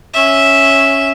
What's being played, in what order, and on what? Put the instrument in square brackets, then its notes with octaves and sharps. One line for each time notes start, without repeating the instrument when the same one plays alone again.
[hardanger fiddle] C#4 E5